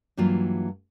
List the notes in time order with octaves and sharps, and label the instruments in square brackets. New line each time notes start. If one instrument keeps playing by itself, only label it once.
[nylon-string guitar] G2 E3 F#3 A#3 F4